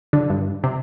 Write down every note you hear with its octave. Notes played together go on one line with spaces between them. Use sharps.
D3
G2
C3